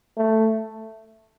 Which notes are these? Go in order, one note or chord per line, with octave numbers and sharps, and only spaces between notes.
A3